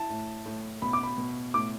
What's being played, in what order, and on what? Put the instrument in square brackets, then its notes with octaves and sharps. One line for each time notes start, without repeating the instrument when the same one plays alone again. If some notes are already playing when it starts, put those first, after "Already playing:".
Already playing: [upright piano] E4 [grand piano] A5
[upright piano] A2
A2
[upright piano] B2 [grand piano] B5
[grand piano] D6
B5
[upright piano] B2
[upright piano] A2 [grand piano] D6